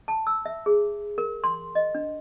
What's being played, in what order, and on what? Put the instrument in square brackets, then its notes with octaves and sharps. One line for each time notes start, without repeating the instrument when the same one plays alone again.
[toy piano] A5
E6
E5
G#4
A#4
C6
D#5
D4